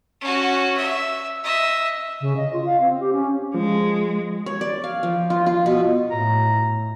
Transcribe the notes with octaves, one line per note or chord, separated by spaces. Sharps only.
C#4 F#4
E5
D#5 E5
C#3
D#5
F4
F5
C4
G4
C#4
F3 G#3
C#5
D5
F5
F3
F4
F4
B2
A2 A#5